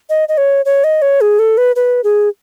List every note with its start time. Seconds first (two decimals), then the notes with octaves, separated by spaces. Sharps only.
0.09 D#5
0.29 D#5
0.37 C#5
0.65 C#5
0.84 D#5
1.02 C#5
1.21 G#4
1.39 A4
1.57 B4
1.76 B4
2.04 G#4